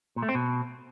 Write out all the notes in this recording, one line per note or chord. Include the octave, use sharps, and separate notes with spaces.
A#2
A3
C4
B2